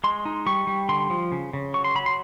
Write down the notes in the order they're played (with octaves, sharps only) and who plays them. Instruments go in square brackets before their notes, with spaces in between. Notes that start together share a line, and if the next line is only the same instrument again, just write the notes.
[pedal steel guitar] G#3 C6
D#4
G3 C#6
G3
D3 C6
F3
C#3
C#3
F#3 C#6
C6
F#3 B5
C6